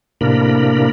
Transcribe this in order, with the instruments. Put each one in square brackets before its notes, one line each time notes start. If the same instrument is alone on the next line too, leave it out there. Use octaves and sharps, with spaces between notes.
[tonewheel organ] A2 C3 A#3 D4 A#4 B5